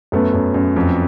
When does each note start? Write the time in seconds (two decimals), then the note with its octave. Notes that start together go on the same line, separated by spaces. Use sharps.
0.12 F#2 A3 B3
0.34 F#2
0.54 F#2
0.76 F2